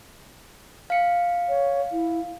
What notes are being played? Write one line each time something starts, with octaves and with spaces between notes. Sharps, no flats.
F5 C#7
C#5
E4